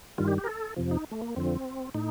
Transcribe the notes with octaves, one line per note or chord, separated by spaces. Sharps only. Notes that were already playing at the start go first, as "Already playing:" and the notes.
G2 D#3 G3 F4
G4
G4
A#4
A4
F2 C3 F3
D#4
A3
A#3
F2 D3 F3 C4
A2 D#4